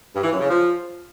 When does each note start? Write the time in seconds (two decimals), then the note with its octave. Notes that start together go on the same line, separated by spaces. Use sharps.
0.13 G2
0.22 E3
0.31 F#2
0.40 C#3
0.49 F3